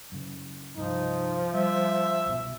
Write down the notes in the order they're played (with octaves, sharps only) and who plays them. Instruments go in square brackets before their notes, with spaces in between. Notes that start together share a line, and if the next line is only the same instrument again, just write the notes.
[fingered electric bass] F#2 C#3
[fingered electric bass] C2 G2 [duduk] F3 [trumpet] D#4
[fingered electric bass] G3 [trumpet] E5
[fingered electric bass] C2 F#2 B2